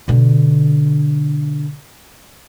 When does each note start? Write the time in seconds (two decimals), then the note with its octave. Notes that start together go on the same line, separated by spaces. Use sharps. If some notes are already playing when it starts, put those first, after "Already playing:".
0.08 B2 D3